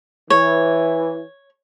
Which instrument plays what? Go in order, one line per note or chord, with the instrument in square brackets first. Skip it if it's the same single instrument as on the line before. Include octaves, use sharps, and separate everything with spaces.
[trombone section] E3 [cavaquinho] C#5